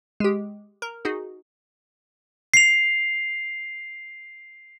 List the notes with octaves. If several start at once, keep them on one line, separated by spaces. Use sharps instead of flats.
G#3 G4
A#4
D#4 F#4 G#4
C7 F7